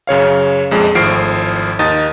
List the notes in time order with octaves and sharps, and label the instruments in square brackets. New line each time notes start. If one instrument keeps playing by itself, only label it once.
[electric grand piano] F#2 C#3 C#5 F5
A#1 F2 G#3
G#1 A2 F3 F6 C7 D7
D#2 D#4 D#6 A6